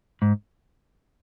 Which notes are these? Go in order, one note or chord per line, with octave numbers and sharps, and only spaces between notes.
G#2